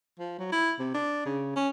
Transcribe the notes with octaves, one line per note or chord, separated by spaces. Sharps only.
F3
F#3
E4
C3
D4
C#3
C#4